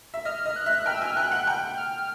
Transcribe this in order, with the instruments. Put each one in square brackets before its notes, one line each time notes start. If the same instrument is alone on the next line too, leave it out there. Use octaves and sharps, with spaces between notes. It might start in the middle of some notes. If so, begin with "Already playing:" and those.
[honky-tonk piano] E5
[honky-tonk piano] D#5 [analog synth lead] F6
[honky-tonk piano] D#5
[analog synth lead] F#6
[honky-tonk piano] E5
[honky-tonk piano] G5 [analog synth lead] F6
[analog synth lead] E6
[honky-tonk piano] G#5 [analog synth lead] F6
[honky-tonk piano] G5 [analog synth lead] F#6
[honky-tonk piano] F#5
G5
[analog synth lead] F6